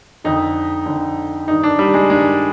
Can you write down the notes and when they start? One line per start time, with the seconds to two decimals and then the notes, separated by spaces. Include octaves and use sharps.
0.24 F2 D3 D#4
0.86 F2 D3
1.47 G2 D#3 D#4
1.63 D4
1.79 G3
1.94 G#3
2.09 G2 D#3 G#3